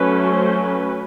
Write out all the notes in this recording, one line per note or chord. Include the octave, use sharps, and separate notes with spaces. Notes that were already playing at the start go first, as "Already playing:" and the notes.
Already playing: F#3 A3 C#4 B4
C5
B4